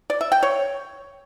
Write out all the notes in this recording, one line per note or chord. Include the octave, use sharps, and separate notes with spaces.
D5
E5
G5
C#5